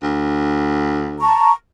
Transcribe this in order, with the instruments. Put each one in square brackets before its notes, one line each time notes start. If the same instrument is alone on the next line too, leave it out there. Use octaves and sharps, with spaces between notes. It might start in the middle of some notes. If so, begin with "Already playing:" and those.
[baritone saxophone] D2
[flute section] A5 A#5 C#6